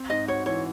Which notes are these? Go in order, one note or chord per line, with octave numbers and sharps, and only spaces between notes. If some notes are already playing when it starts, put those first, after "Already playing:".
Already playing: C4
G#2 D#5
F#4 C#5
E3 C#5